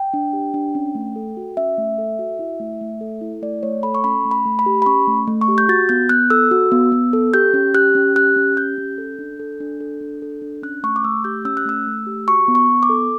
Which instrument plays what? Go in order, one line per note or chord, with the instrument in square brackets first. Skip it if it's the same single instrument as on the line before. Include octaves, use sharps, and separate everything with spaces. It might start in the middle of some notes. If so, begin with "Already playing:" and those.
Already playing: [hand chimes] G5
D4
G4
D4
C#4
A3
A4
F#4
C#4 E5
A3
A4
F#4
E4
A3
A3
A4
E4
A3 D5
A3 C#5
A4 B5
C#6
C#4 B5
A3
B5
A3
B5
G4
B5
C#4 C#6
A3
A3
C#6
G4
G6
F#4 A6
B3 G6
B3 F#6
A4 E6
F#4
B3
B3
A4
G4 G6
C#4
G4 F#6
C#4
G4 F#6
C#4
G4 G6
C#4
A4
D4
A4
D4
A4
D4
A4
D4
C#4 F#6
A3 C#6
D6
A3 E6
G4 G6
C#4 E6
F#6
A3 E6
A3
G4
F#4 C#6
B3
C#6
B3
D6
A4